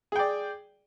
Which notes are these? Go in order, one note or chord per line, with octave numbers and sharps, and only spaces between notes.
G#4 D5 G5